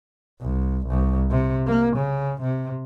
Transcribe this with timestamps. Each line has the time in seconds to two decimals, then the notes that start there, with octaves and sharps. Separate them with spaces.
0.41 C2
0.87 C2
1.31 C3
1.67 A#3
1.97 C#3
2.41 C3